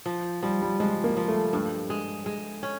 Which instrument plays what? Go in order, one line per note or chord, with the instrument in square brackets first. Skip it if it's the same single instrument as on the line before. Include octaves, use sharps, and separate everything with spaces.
[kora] F3
[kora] F3 [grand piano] G3
[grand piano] G3
[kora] F3 [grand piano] G#3
[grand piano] A#3
[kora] F3
[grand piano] A3
[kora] G2 [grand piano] A3
[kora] G#3
G#3
C#4